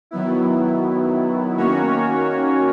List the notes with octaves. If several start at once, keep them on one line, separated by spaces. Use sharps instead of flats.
D#3 F#3 B3 E4
D#3 A#3 C#4 F#4 C#5